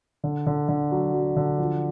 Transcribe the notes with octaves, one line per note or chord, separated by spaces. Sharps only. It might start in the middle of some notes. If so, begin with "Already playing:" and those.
D3
D3
D3
F#3
F#3
D3
F3